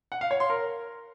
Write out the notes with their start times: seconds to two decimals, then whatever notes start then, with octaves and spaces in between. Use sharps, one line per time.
0.12 F#5
0.21 F5
0.31 C#5
0.40 C6
0.50 A#4